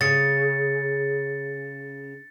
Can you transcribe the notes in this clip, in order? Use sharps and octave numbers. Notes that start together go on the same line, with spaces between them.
C#3 A6 C#7